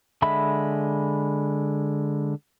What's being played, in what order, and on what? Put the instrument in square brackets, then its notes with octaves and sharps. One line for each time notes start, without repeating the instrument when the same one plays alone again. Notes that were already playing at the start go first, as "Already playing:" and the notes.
[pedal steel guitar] D3 G#3 E5 B5